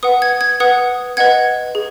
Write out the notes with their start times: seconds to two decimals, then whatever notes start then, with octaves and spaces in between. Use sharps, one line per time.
0.03 B4 F#5 D#6
0.22 G#6
0.41 G#6
0.60 B4 F#5 D#6
1.17 B4 D#5 F#5 G#6
1.75 G#4